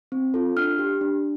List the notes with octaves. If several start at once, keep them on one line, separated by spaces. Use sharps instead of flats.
C4
F4 A4
D4 F6
G4
D4